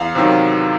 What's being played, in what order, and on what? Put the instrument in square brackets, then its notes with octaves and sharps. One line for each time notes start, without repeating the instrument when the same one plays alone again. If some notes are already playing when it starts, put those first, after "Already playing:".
Already playing: [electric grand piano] E2 F5
C3 D#3 F#3